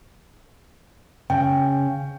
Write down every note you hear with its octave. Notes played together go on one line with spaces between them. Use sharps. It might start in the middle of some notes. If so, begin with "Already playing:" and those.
C#3 G5